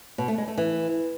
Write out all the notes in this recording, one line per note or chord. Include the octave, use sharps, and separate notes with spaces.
B2
A3
G#3
A3
E3